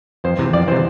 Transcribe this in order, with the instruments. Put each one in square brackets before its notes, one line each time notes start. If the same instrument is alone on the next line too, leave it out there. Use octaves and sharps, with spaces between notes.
[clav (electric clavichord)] F2 [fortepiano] C5
[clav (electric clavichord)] C3 E3
[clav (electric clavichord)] F2 [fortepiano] D5
[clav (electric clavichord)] C3 E3 [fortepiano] C5